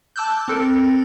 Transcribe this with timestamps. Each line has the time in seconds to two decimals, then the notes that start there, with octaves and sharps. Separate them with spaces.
0.16 A5 D6 E6 F#6 G6
0.48 C4 A4 A#4